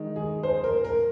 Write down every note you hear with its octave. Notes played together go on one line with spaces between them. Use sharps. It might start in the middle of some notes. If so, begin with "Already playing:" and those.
Already playing: D#3 G#3 D#4
G#4
C5
A#4
A#4